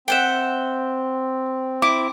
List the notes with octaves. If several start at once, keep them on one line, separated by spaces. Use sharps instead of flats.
C4 E5 F#5 G5
E4 D6